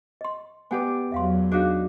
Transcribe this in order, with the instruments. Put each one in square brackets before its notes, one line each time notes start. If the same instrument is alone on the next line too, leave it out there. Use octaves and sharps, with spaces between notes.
[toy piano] D#5 C6
[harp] B3 G4 D5 [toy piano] B4 F#5 G#5
[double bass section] E2 F#3 [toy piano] E5 F5 C6
[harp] D4 D#4 F#4 [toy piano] G#4 F5